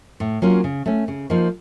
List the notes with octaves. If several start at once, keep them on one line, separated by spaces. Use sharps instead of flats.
A2
F#3 A#3 C#4 F4
C#3
A3 C#4
C#3
F3 A#3 D#4